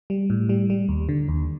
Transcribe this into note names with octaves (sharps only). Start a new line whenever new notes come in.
G3
A2
G3
G3
D#2
D3
D#2